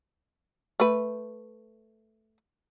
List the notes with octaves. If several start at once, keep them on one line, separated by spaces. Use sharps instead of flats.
A3 B4